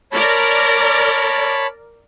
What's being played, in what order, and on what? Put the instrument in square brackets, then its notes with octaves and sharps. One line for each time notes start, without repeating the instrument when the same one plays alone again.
[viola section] A#4 D5 [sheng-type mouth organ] C#5 A5 B5